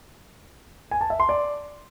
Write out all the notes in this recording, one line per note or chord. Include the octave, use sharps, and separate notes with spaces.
G#5
A5
E5
C6
D5